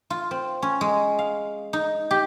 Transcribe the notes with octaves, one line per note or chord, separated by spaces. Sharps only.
F4
C4
C#4
G#3
F5
D#4
G4